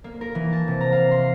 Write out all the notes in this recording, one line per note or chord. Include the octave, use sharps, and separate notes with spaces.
A#3
A#4
E3
A5
C3
A#5
F5
C6